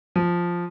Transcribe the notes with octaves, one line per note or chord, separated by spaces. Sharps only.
F3